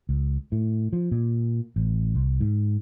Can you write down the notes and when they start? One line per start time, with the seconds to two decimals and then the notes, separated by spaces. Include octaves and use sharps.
0.09 C#2
0.52 A2
0.93 F3
1.11 A#2
1.76 A1
2.15 C2
2.40 G#2